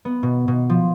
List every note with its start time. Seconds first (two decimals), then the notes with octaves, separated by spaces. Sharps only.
0.05 B3
0.23 B2
0.48 B2
0.69 F3